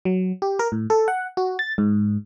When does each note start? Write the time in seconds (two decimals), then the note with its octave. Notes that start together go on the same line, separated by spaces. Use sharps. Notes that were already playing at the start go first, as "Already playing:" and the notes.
0.05 F#3
0.42 G4
0.59 A#4
0.72 A2
0.90 A4
1.08 F#5
1.37 F#4
1.59 A6
1.78 G#2